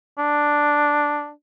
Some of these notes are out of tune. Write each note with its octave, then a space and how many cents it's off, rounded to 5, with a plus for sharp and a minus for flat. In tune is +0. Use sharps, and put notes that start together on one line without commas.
D4 +0